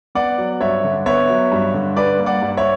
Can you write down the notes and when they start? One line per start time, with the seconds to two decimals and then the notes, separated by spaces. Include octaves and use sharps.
0.15 B3 D5 F#5
0.38 F#3
0.61 G2 C#5 E5
0.84 D3
1.06 B3 C#5 E5
1.29 F#3
1.52 G2
1.74 D3
1.96 G2 B4 D5
2.19 A#3
2.26 D5 F#5
2.42 G2
2.57 C#5 E5